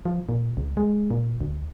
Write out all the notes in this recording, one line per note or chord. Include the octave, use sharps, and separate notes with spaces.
F3
A#2
C#2
G#3
A#2
D2